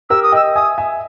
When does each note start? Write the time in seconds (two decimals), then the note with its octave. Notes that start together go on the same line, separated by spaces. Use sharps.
0.10 G4 A#4 E6
0.23 D#6
0.32 D#5 G5 E6
0.55 E5 G#5 D#6
0.78 E5 G#5